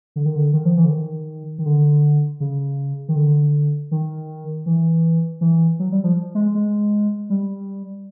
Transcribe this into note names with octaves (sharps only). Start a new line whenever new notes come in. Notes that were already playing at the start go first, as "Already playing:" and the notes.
D3
D#3
D3
D#3
F3
E3
D3
D#3
D#3
D3
C#3
D#3
D3
D#3
E3
E3
F#3
G3
F3
G#3
G#3
G3